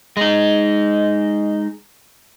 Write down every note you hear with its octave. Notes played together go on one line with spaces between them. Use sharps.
G#3 D#4